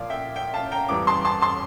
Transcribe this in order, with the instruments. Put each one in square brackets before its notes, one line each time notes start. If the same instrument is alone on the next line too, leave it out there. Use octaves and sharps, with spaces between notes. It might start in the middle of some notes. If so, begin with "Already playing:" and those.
Already playing: [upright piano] A#2 F3 D5 F5
E5 G5
E5 G5
F5 A5
G5 A#5
F2 E3 G3 A#5 D6
A5 C6
A5 C6
A5 C6